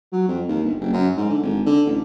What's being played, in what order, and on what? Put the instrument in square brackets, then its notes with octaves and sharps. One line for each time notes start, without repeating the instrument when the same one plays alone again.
[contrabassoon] F#3
F2
D#2
G1
F#1
F#2
G#2
D3
G#1
D3
A1